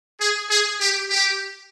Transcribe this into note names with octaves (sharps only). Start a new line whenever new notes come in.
G#4
G#4
G4
G4